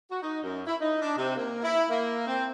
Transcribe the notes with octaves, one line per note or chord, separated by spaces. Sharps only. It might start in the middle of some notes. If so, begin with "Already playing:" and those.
F#4
D#4
F#2
E4
D#4
D4
C3
A#3
E4
A#3
C4